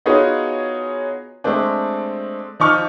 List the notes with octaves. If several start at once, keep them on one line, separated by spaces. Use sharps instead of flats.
B3 D#4 F4 F#4 G#4 C#5
G#3 A3 C4 D4
F3 D#4 C#6 F6